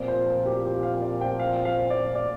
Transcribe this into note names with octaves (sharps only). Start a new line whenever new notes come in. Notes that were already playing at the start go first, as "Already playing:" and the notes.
Already playing: A#2 F3 C4 D5
C5
A#4
G4
G4
F5
D5
G5
F5
F5
D5
D5